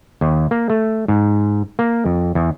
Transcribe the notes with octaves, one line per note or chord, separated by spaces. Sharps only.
D#2
A#3
A3
G#2
A#3
F2
E2